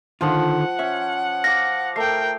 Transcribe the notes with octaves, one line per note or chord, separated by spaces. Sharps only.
D3 D#3 F3 F4 F#5
C#4 E5
F5 D6 A#6
A3 A#4 G5 C7